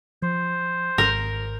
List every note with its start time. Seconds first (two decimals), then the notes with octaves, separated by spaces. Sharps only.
0.22 F3 C5
0.98 G#1 A#4